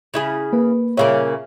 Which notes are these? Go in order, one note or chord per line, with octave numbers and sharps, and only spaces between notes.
C#3 E4 G#4
A#3 B4
A#2 C#3 A#3 C#5 E5 F5